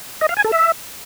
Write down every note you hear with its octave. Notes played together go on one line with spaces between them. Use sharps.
D#5
F5
G#5
A4
E5